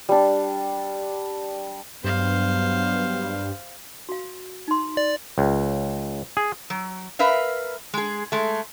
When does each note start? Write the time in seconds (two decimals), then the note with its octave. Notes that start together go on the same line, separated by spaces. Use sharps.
0.09 G3 D4
2.04 G2 F#3 B3 C5 F5
4.09 F#4 F5
4.68 D#4 C6
4.97 D5
5.38 C#2
6.37 G#4
6.70 F#3
7.19 A#4 B4 E5 F5
7.94 G#3 G#4
8.32 G#3 A3